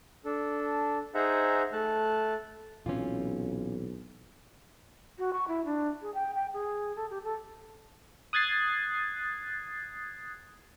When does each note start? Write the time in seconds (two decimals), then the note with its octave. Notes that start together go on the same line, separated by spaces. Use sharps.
0.25 D4 A4
1.15 D#4 G#4 C5 E5 F#5 A#5
1.73 A3 A5 F#6
2.86 B1 A#2 E3 C4 C#4 F4
5.18 F#4
5.33 C#6
5.48 E4
5.65 D4
6.02 G#4
6.14 G5
6.35 G5
6.53 G#4
6.96 A4
7.10 G4
7.24 A4
8.33 D#6 F#6 G#6 A6 C7